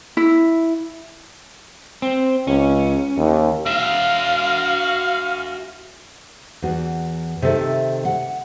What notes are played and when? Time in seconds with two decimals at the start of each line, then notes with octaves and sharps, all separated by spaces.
0.17 E4
2.02 C4
2.47 C#2 C#4
3.17 D#2
3.66 F#4 E5 F5
6.62 E2 F#4
7.42 C3 D#3 A4 E5
8.05 F#5